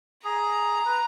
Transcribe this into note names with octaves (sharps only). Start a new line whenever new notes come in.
G#4 A#5
B4